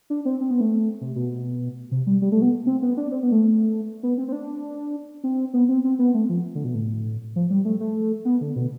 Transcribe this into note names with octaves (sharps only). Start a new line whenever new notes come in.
D4
C4
C4
B3
A3
C3
B2
C3
G3
G3
A3
B3
C4
B3
D4
C4
B3
A3
B3
C4
C4
D4
C4
B3
C4
C4
B3
A3
F3
D3
B2
A2
F3
G3
A3
A3
B3
D3
B2